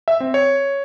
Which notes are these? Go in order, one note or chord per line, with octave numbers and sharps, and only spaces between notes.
E5
C4
C#5